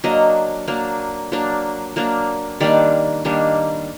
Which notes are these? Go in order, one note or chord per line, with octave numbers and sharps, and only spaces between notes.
F#3 A#3 D4 D#5
F#3 A#3 D4
F#3 A#3 D4
F#3 A#3 D4
D#3 G3 A#3 D4 D5
D#3 G3 A#3 D4